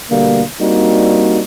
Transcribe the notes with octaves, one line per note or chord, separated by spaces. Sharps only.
B2 D3 G3 A3 A#3
G3 A#3 C4 D4 D#4 F#4